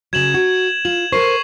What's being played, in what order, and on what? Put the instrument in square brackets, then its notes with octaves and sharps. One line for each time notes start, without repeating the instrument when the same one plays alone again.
[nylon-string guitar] C#3 F#3 [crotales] G#6 E7 F#7
[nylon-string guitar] F#4 [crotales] G#6
[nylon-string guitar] F4 [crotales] E7 F#7
[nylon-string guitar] A4 A#4 C5 [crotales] C#6 C7